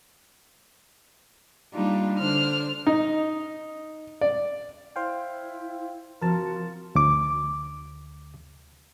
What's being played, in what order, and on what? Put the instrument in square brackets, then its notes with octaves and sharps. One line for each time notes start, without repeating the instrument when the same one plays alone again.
[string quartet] G3 A#3 D4 D#4 F4
D3 D4 C5 F6
[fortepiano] D#4
D5
[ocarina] E4 [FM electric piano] C5 F5 G5
[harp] F3 C4 F6 [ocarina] F#4 [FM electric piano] A#4 A5
[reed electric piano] D2 D6